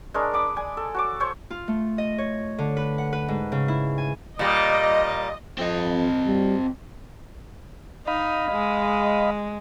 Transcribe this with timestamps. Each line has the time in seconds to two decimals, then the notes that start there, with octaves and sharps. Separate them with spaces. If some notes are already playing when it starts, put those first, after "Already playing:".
0.14 G#3 D4 A#4 C#5
0.34 B5 D6 D#6
0.56 D5 G#5
0.77 A4
0.94 F#4 C#5 D6
1.20 C5 C#5 C#6
1.50 F4
1.68 A3
1.98 D#5
2.18 C#5
2.58 D3
2.77 B4
2.98 F#5
3.13 B4
3.28 G#2
3.52 C#3
3.68 E4
3.98 G#5
4.39 A#2 G3 D#5
5.59 F2 C4 D#5
6.27 G3
8.07 D#4 D#5 F5 B5
8.51 G#3